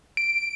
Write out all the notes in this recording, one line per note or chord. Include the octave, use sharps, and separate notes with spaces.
D7